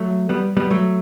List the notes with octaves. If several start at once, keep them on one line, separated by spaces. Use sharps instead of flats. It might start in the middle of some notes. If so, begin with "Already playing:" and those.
Already playing: F#3 A3
G3 B3
G3 B3
F#3 A3